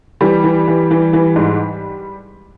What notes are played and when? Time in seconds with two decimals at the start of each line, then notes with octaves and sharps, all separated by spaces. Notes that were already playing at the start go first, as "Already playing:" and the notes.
0.21 E3 G3
0.44 E3
0.68 E3
0.91 E3
1.13 E3
1.36 G#2